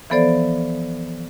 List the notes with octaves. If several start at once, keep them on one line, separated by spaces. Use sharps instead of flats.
E3 F3 B3 A4 C5 D5